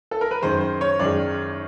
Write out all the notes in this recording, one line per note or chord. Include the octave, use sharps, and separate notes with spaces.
A4
A#4
B4
F#2 D#3 G#3 C5
C5
C#5
F#2 D#3 G#3 D5